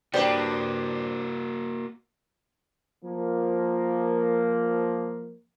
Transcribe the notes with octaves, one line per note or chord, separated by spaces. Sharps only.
G3 A#3 D4 F#4 G4 B4 C5
F3 A#3